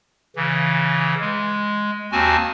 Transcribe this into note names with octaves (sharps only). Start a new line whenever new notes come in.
C#3 E3
G#3
D#2 C4 F#4 G#5 A5